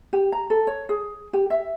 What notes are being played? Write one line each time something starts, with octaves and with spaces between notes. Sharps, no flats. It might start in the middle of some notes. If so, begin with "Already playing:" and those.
G4
A#5
A4
C#5
G#4
G4
E5